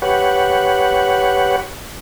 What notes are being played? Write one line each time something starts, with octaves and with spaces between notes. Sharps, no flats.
G4 B4 C#5 F#5